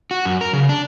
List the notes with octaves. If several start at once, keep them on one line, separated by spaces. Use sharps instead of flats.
F#4
F#2
A#4
C#3
D4